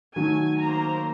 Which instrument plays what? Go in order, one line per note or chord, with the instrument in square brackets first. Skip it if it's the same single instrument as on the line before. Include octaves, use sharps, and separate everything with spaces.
[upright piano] D#3 F#3 A3 [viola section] G#5
[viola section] A#3 C5 A#5